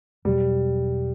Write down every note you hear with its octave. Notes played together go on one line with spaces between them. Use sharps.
E2 B2 F#3 G3